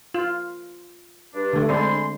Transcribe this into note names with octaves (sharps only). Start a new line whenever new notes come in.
F4
G2 D4
D3 A3
G#3 C4 D4 G#5 B5 C6